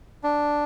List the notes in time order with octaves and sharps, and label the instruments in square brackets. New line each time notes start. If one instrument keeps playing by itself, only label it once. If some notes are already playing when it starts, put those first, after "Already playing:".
[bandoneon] D4